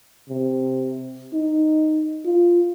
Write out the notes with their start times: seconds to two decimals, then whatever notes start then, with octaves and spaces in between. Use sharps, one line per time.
0.29 C3
1.33 D#4
2.25 F4